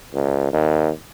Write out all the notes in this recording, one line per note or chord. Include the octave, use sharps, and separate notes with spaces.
C#2
D#2